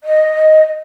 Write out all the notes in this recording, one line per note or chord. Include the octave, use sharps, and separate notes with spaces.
D#5